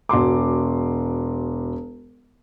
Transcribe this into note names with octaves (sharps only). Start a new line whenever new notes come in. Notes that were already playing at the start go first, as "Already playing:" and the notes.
E1 F#4 C6 D6